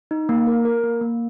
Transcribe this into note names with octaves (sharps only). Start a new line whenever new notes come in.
D#4
A#3
A#4
A#4
A#3
A#3